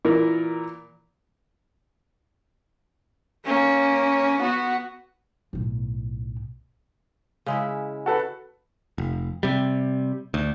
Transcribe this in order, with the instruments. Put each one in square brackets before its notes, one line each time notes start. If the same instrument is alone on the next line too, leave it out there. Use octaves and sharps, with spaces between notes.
[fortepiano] A#2 E3 E4 A#4
[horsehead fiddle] A#3 C#4
B3 F#4
[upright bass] B1 A2
[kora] C#3 G#3 E4
[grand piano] F#4 A4 B4
[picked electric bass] F1
C3 G3
D2